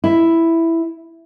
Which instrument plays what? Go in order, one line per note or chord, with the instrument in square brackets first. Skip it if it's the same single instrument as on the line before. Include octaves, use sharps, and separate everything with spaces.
[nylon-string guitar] E4